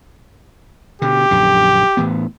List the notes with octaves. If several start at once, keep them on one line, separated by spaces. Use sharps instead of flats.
B2 D3 G4
A#1 F#2 D3
A2 E3 B3